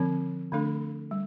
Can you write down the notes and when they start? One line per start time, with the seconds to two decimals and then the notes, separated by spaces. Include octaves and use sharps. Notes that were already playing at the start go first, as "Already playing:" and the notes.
Already playing: D3 F3 C4
0.52 D3 A3 D4 A4
1.11 G3